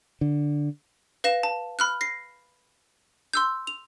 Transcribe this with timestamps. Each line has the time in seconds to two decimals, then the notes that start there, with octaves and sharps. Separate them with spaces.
0.21 D3
1.24 B4 F5 A#6 E7
1.43 A5
1.79 B5 F6 F#6
2.01 A#6 C7
3.34 C6 E6 G6
3.67 F7